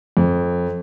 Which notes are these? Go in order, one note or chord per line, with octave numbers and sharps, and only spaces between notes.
F2